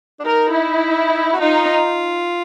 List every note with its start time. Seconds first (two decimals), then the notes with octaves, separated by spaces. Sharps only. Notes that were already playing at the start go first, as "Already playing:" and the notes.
0.20 D4
0.24 D#4 A#4
0.53 E4
1.33 F#4
1.41 D#4 F4